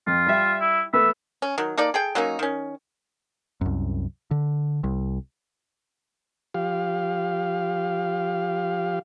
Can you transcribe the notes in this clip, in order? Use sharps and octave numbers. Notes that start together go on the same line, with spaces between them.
F2 F4
G3 E5
E4
A3 B3 E5
C#4
D#3 F#3
A#3 D#4 A4 D5
G#4 A4 G5
F#3 A#3 C#4 D#4
D#3 C#4
C2 F#2
D3
C2
F3 G4 F5